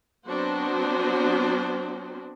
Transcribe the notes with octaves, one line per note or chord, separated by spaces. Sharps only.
F#3 B3 C4 D4 F#4 C5